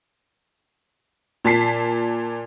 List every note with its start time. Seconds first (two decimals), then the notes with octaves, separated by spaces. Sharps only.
1.45 A#2 A5 B6 C7